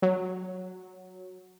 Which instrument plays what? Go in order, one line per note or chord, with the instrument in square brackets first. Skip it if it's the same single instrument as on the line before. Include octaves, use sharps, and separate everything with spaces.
[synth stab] F#3